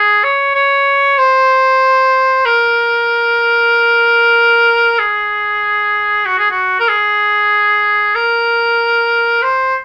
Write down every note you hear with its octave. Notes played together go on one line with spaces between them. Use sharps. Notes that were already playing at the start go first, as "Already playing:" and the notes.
Already playing: G#4
C#5
C#5
C5
A#4
G#4
F#4
G#4
F#4
A#4
G#4
A#4
C5